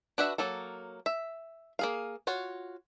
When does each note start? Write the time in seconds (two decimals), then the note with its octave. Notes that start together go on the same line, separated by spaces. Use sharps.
0.18 D4 F#4 B4 E5
0.38 F#3 A#3 A4
1.06 E5
1.79 A#3 G#4 F5
2.27 F4 F#4 C#5